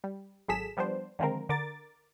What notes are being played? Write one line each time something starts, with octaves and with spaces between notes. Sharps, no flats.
G3
G#1 F#3 G#4 A4 B6 E7
F3 G3 B3 D4 C5
D3 D#3 F3 G#3 C4 A#4
D3 A#4 D6 A6